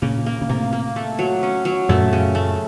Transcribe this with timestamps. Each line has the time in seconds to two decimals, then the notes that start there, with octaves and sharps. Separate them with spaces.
0.02 A#2 C#3 A#3
0.26 A#3
0.41 C#3
0.49 A2 C3 A#3
0.73 A#3
0.96 A3
1.19 F#3
1.43 C#4
1.65 F#3
1.89 F#2 A#2 A3
2.13 C#3
2.35 A3